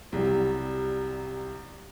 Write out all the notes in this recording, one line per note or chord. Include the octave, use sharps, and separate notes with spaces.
C2 F#3 G3